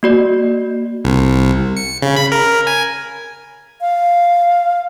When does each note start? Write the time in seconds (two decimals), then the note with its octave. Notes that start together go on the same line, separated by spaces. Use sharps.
0.03 A#3 F#4 D5
1.05 C2
1.77 C#7
2.02 C#3
2.16 B5
2.32 A#4
2.67 G#5
3.81 F5